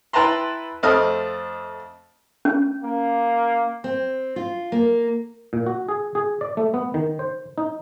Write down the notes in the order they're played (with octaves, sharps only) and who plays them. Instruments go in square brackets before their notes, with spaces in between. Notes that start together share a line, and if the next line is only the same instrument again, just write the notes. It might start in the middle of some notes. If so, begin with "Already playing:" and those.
[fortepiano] E4 B4 G5 A5 A#5 C6
F2 A3 C4 D#5 D#6 F6
[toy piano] C#4
[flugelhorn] A#3
[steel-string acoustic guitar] C4
F4
A#3
[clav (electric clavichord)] A#2
F#4
G#4
G#4
D5
A3
B3
D#3
C5
D#4